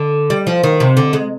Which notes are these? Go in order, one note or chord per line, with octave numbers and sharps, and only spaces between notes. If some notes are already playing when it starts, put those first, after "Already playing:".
Already playing: D3
G3
F3
D#3
C3
D3
G#3